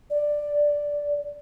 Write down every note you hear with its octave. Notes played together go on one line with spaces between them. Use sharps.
D5